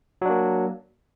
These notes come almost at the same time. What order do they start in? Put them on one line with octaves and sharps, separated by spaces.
F#3 D4 A#3